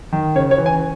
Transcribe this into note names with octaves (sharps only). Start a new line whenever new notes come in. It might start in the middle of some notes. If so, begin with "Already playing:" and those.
D#3
C#3 C#5
C#5
E3
G#5